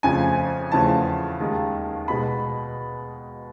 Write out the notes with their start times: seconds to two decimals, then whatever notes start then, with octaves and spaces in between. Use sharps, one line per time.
0.03 F2 C#3 F3 A3 G#5
0.71 E2 C#3 F3 A3 A5
1.40 D#2 D#3 G#3
2.08 B2 G#3 B5